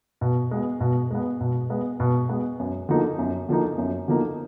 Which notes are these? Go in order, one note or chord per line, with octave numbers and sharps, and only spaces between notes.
B2
G#3 B3
B2
G#3 B3
B2
G#3 B3
B2
G#3 B3
F#2
D3 F3 A#3 D#4
F#2
D3 F3 A#3 D#4
F#2
D3 F3 A#3 D#4